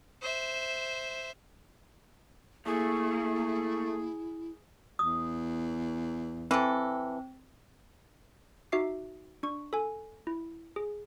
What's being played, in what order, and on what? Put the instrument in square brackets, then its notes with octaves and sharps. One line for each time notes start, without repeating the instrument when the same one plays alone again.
[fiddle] C5 E5
[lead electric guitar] A3 [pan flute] A#3 [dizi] E4 [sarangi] G#4
[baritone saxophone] E2 [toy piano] D#6
[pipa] E3 A4 [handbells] C4
[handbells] D#4 F#4 E5 D6 C7
D4 C#6
A4 G#5
E4
G#4